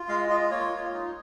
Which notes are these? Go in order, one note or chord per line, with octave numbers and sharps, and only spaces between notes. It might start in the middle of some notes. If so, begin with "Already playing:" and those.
Already playing: F4
G#3 F5
F4 D#5
A#3 C#5
F4
D#4